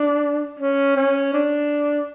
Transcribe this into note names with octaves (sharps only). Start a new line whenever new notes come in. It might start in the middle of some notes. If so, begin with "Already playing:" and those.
Already playing: D4
C#4
C#4
D4